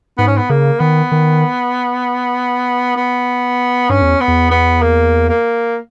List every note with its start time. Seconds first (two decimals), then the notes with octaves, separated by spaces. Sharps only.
0.18 G#2 B3
0.27 C#4
0.37 B3
0.49 C#3 A#3
0.80 D#3 B3
1.12 D#3
2.97 B3
3.89 G2 C#4
4.02 E2
4.21 B3
4.28 E2
4.51 B3
4.82 A#3
5.29 A#3